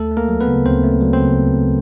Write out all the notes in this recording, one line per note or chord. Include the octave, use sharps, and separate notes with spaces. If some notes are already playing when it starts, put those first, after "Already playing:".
Already playing: D2 A3 A4
A3
A#3 A#4
F#3
B3 B4
C#3
D2 C4 C5
A3
F#3
C4 C5
C#3